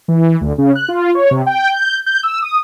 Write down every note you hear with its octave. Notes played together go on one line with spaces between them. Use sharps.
E3
D2
C#3
F#6
F4
C#5
C3
G5
G6
G6
E6
D#6